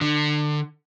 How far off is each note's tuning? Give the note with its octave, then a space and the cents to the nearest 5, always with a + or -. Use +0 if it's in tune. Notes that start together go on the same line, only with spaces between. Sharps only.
D3 +25